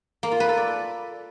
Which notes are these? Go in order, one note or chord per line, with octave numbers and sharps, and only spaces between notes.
A#3
F4
B4
A4
D5